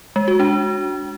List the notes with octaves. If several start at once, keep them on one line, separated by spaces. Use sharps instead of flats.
G#3
F#4
D4